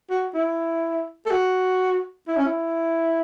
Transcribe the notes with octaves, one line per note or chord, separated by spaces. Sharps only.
F#4
E4
A4
F#4
E4
C#4
E4